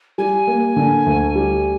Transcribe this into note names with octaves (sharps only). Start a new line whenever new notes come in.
G3 G#5
A#3
D3
D2
G3